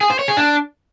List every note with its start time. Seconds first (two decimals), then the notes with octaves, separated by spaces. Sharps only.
0.01 G#4
0.10 C5
0.19 C#5
0.28 G#4
0.37 D4